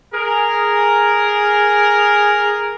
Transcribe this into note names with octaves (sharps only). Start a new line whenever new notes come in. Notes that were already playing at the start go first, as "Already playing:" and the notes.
G#4 A#4